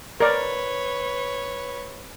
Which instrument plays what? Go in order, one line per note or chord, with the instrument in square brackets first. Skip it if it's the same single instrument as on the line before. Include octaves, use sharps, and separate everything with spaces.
[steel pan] A#4 D5 [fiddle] B4 C#5